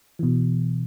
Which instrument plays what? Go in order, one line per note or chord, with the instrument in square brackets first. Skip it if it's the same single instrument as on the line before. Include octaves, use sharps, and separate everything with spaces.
[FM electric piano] B2 E3